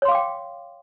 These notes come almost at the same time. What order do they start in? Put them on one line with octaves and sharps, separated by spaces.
C#5 C6 F5 D6 G5